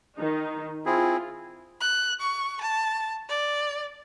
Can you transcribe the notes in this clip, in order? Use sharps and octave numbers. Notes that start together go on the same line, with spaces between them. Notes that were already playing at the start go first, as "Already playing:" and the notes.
D#3 D#4
C4 E4 F4 G#4
F#6
C#6
A5
D5